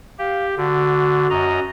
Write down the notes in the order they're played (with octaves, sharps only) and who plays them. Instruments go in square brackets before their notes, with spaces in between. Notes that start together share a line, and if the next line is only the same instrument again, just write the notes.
[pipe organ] G4 [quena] F5
[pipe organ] D3 [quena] F#4
[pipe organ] F#2 D#5 A#5